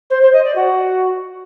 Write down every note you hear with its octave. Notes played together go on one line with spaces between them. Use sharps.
C5
C5
D#5
D5
F#4